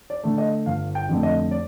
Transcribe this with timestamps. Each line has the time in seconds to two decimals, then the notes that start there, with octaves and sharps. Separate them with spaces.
0.10 D5
0.24 D3 A3
0.38 D#5
0.66 G1 F5
0.95 G5
1.09 F2 D3 A3
1.23 D#5
1.51 D5